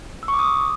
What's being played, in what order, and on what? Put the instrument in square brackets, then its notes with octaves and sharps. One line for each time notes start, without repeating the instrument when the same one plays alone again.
[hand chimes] E6
C#6
D6
D#6